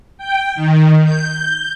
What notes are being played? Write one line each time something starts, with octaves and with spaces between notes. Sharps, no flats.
G5
D#3
G6